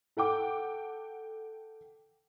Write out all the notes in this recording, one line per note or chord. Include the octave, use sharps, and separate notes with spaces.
A4 F#5 G5 D6